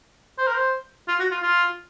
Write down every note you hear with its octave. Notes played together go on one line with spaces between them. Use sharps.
C5
A#4
C5
F4
F#4
F4
F4